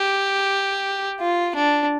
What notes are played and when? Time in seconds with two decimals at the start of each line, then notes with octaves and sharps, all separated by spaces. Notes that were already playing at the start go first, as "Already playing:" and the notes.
Already playing: G4
1.20 F4
1.55 D4